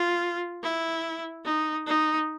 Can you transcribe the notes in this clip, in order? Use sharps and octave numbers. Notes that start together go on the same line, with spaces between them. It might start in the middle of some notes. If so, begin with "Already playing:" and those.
Already playing: F4
E4
D#4
D#4